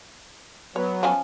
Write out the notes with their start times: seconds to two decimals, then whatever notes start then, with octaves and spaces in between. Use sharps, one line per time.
0.76 F#3 B3 C#5
1.03 F3 C#4 G#5